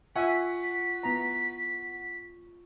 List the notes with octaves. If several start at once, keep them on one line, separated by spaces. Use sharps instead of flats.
F4 E5 F#5 G#5 C#6 B6
B3 E4 A#5